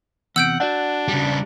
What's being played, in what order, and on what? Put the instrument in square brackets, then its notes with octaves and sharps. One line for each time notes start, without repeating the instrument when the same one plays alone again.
[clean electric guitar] E2 C3 [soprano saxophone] F#5 [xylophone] E6 G6 D7
[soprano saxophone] D4 [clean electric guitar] F#4 D5 F#5
[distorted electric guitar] C#3 G3